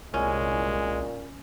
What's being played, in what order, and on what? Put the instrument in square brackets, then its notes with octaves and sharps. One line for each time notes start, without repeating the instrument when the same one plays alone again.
[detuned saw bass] C2 [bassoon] A#2 [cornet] G#3 [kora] C#4